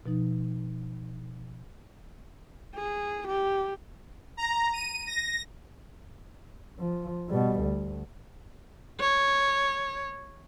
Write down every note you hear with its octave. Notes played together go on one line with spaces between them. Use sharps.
B2 F3 D#4
G#4
G4
A#5
D#7
A#6
F3
B2 G3
D2
C#5